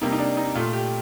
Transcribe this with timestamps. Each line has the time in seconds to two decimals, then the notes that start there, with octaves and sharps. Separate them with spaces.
0.01 C3 G3 A#3 D#4
0.12 D#4
0.19 D4
0.37 D#4
0.55 A#2 A3 F4
0.73 G4